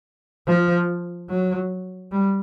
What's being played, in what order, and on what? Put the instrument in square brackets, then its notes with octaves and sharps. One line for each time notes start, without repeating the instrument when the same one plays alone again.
[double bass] F3
F#3
G3